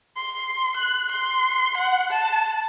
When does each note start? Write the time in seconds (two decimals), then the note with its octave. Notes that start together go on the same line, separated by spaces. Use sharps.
0.16 C6
0.76 F#6
1.11 C6
1.77 F#5
2.11 A5